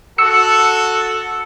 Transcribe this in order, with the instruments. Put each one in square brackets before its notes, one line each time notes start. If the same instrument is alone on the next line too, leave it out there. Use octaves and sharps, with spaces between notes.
[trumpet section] F#4 A4 [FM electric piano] E6 C#7